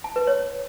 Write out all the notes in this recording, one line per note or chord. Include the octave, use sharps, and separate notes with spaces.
A5
B4
C#5